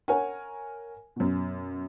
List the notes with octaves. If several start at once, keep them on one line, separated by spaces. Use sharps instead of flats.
A#4 C#5 F#5 G#5
F#2 B2